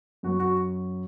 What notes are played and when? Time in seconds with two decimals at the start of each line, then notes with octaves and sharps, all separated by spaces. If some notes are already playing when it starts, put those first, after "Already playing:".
0.23 F#2 F#3 F#4
0.39 F#4